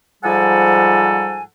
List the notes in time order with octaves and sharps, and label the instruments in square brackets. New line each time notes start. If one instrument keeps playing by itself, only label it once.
[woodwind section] G#2 F3 G3 A4 F#5 G#5